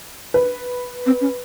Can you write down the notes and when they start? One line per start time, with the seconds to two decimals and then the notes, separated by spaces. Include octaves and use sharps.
0.34 B4
1.06 C4
1.21 C#4